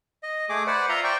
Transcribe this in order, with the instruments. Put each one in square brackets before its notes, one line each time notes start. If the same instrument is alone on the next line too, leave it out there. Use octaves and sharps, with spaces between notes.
[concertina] D#5
A3 G#4 D6
B4 C5 D5 F#5
F4 E5 A#5 C6
C5 D5 G5 C#6